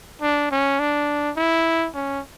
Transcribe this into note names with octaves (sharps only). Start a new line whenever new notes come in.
D4
C#4
D4
E4
C#4